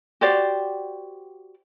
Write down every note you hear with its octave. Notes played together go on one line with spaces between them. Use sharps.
F#4 G4 C5 D5